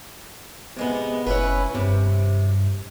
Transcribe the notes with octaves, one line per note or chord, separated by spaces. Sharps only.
C3 G#3 B3
F#1 C#4 E4 B4
G2 C3